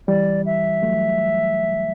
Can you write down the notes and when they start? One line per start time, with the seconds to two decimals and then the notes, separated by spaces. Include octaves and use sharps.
0.08 E3 G3 D5
0.46 E5
0.82 F#3 A3